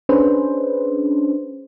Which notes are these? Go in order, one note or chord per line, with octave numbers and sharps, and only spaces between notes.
C#4 D4 G#4 B4 C5